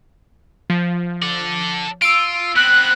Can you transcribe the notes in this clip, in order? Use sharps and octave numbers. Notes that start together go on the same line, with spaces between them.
F3
A4 D5
F4 E6 D7
B3 C4 F#6